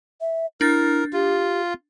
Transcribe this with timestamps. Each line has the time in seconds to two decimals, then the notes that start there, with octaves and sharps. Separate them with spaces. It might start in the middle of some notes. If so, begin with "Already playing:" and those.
0.21 E5
0.61 D4 E4 A#4 A6
1.13 F4 G4